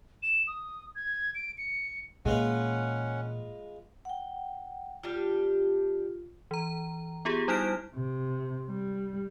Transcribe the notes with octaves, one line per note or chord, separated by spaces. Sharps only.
E7
D#6
G#6
D7
C#7
A#2 E3 G#3 C#4 F4 B4 F#5
F#5 G5
G3 D4 F4 G4
E3 A#5
B3 F4 G4 G#4
G3 D#4 E4 F6 D7
C3
G3